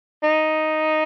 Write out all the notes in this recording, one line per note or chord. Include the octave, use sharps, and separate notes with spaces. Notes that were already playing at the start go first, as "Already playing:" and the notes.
D#4